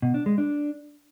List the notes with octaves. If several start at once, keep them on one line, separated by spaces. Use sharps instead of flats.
B2
D4
G#3
D4